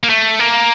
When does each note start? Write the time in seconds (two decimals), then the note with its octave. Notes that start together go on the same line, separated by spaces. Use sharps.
0.03 A#3
0.09 A3
0.39 A#3